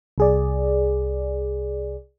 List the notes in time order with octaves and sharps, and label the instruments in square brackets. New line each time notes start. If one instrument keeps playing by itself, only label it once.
[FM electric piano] C2 G#4 D5